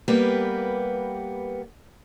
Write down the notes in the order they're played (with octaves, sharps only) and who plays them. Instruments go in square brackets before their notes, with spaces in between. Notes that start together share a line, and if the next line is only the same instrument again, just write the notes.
[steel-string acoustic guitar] G3 A#3 B3 G4 B4